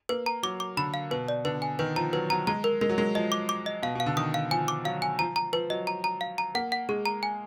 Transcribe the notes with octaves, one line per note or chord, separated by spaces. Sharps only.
A#3 B4
A#5
F#3 D6
D6
D3 B5
F5
B2 B4
D5
D3 B4
G#5
D#3 B4
F3 A#5
F#3 B4
F#3 A#5
G#3 A#5
A#4
G#3 A#4
F#3
G#3 A#4
F3 D#5
D6
D6
D#5
B2 F5
B2 F5
D3
D#3 D#6
F5
F3 G#5
D6
F#3 F5
G#5
F3 A#5
A#5
F3 B4
F#3 D#5
A#5
A#5
F5
A#5
A#3 F#5
F#5
G#3 G#4
A#5
G#5